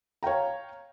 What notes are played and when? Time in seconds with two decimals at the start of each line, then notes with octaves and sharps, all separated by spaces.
0.23 C#5 F5 G5 A#5